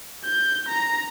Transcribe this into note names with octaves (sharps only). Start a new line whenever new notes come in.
G6
A#5